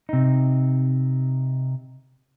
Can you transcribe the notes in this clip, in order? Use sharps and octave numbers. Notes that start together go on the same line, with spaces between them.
C3 D#4